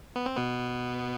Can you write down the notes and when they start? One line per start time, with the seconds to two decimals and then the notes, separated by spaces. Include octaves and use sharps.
0.16 B3
0.26 C4
0.37 B2 B3